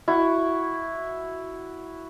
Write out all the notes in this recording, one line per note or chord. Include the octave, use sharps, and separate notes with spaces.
E4 F#4